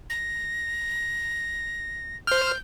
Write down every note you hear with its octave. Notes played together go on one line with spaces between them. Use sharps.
A#6
C5 F6 G6